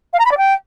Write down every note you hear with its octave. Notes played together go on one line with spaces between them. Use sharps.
F5
A#5
B5
D5
G5